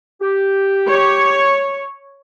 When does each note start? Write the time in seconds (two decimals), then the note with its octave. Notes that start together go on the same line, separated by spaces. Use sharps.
0.22 G4
0.89 C#5